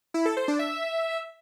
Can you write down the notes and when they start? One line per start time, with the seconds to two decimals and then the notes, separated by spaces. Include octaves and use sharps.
0.14 E4
0.26 A4
0.37 C5
0.48 D4
0.59 E5